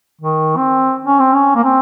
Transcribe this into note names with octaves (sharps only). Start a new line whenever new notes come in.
D#3
C4
C#4
C4
C#4
A#3
C4